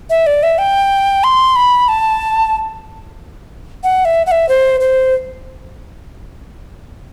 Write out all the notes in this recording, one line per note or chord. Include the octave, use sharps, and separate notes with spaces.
E5
D5
E5
G5
C6
B5
A5
F#5
E5
F#5
E5
C5
C5